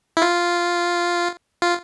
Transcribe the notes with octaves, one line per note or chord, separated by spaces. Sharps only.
E4
F4
F4